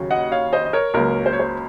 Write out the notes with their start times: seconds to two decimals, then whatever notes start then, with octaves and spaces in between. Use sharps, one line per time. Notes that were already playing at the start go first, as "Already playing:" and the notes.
Already playing: D#2 C#3 F#3
0.10 D#5 F#5
0.32 C#5 F5
0.53 C5 D#5
0.65 D#5
0.73 A#4 C#5
0.94 C#2 C#3 F#3 A#3 A#4
1.26 C5
1.33 C#5
1.40 C5